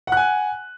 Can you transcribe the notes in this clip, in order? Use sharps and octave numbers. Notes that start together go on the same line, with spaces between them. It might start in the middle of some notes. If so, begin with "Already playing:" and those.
F#5 G#5 F#6